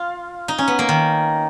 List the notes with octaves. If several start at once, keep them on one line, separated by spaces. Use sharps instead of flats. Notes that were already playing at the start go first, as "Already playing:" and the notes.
Already playing: F4
D#4
C#4
B3
A#3
D#3